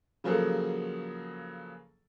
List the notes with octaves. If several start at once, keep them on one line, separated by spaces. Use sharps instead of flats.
C#3 F3 F#3 A#3 G#4 A4